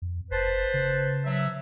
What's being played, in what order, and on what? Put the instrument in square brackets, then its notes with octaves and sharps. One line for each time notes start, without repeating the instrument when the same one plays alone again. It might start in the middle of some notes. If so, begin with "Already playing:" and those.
[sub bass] F2
[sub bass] F#1 [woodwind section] B4 C5 A5
[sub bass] C#3
[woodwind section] F#3 E5